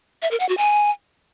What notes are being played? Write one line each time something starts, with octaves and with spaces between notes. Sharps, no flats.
E5
A#4
F#5
F#4
G#5